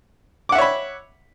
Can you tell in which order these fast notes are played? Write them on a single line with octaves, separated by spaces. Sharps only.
D6 F#5 E5 C#5 B5